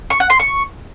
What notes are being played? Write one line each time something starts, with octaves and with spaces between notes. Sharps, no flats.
C#6
F#5
C6
C#6